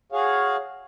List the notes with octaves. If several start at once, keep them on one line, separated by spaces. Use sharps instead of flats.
F#4 G#4 C#5 F5